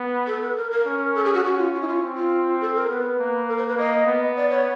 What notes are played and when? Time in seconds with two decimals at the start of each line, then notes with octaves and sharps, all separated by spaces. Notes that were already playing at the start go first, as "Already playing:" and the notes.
Already playing: B3
0.27 A4
0.42 B4
0.57 A#4
0.71 A#4
0.86 C#4
1.15 A4
1.25 G#4
1.34 F#4
1.44 C#4 F#4
1.59 F4
1.74 F4
1.81 E4
1.88 F4
2.03 C4
2.17 F4
2.61 A4
2.75 A#4
2.90 B3 B4
3.19 A#3
3.48 A#4
3.58 C5
3.68 B4
3.77 A#3 D#5
4.06 B3
4.36 D5
4.50 C#5